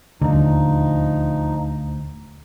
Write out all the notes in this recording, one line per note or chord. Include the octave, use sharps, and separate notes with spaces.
D#1 D2 D3 F3 D#4